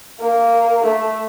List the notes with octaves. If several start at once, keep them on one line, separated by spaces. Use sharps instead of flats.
A#3
A3